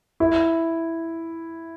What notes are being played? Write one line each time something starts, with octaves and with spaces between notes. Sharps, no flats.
E4